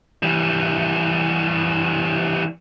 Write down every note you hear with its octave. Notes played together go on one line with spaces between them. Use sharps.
E3 G3